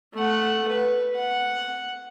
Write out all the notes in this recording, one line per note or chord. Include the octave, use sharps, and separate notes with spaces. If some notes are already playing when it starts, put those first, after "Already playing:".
A3 F#5
B4
F#5